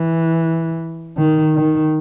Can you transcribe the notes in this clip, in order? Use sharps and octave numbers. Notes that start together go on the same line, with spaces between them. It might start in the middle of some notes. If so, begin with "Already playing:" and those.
Already playing: E3
D#3
D#3